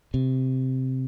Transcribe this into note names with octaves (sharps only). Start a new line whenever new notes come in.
C3